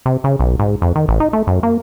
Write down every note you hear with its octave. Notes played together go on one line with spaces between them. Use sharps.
C3
C#3
B1
G#2
F2
D#3
A1
D#4
A3
F#2
A#3